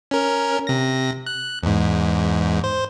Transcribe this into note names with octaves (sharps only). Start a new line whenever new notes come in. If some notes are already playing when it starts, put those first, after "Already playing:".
C#4 A#4
C3 A#6
F#6
E2 G#2
C5